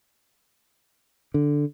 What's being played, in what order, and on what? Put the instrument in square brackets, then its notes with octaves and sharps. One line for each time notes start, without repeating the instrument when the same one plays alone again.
[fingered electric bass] D3